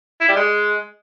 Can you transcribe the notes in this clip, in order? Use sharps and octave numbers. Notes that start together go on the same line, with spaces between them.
E4
G3
G#3